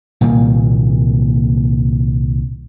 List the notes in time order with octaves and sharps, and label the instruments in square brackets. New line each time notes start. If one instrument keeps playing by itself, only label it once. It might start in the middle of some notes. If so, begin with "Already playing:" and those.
[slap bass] C2 A#2 D#3 A#3